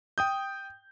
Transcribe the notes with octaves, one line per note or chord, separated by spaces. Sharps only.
G5 D#6 G6